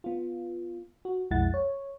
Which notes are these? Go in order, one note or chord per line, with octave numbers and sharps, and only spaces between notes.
B3 F4
F#4
B1 F2 G#3 E4 F#5 A6
C#5